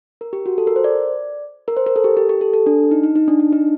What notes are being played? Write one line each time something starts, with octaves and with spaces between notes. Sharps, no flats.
A#4
G4
F#4
A4
A#4
C5
D5
A#4
C5
A#4
A4
G4
G4
G4
A4
A4
D4
D#4
D#4
D#4
D4
D4
D#4